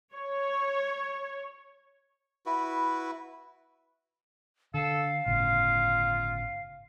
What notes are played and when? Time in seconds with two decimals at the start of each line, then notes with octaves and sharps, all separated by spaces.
0.14 C#5
2.46 E4 F#4 B4
4.74 D3 A4 F5
5.26 G1 A2 C#3 F4